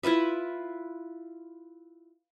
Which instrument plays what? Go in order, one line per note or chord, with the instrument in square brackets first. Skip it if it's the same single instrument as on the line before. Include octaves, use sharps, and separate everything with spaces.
[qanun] E4 F4 B4 E5